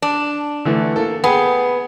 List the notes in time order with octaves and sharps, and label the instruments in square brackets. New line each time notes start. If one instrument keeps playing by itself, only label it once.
[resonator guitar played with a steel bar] D4
[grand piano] D3 E3 A3
A#3 A4
[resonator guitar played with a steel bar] B3 [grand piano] G#4 G5